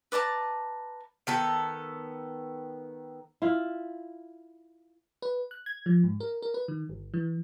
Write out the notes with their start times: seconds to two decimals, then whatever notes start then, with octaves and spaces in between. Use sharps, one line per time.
0.12 B4 D5 A5 A#5
1.27 D#3 B3 A4
3.42 E4 F4 F5
5.22 B4
5.51 F#6
5.66 G#6
5.86 F3
6.04 G#2
6.20 A#4
6.42 A#4
6.54 B4
6.68 D#3
6.89 G1
7.14 E3